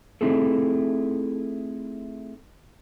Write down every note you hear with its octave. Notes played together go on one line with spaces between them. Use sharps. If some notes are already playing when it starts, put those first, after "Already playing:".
A3 C4 D#4 E4 G#4 A4